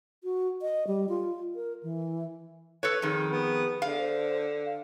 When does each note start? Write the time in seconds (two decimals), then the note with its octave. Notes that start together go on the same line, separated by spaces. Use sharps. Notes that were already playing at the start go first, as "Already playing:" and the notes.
0.24 F#4
0.62 D#5
0.87 G3
1.09 F4
1.55 A#4
1.83 E3
2.83 A4 B4 C#5
3.02 F2 D#3 G#4
3.31 B3
3.82 D3 F5
3.99 C5
4.66 F5